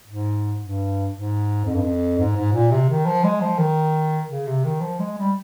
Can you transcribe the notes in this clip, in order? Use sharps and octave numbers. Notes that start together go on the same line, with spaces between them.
G#2
G2
G#2
F2
G2
F2
G#2
G#2
A#2
C3
D#3
F3
G#3
F3
D#3
C#3
C3
D#3
F3
G#3
G3